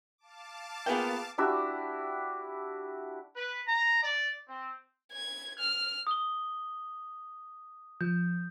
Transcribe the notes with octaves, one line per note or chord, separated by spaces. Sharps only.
F5 A5 D6
A#3 B3 F4 G#4 G5
D4 E4 F#4 G4
B4
A#5
D5
C4
G#6
F6
D#6 G7
F3 G6